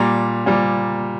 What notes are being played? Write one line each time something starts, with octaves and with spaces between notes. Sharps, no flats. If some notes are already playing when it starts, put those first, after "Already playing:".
Already playing: A#2 G3 A#5
A#2 G3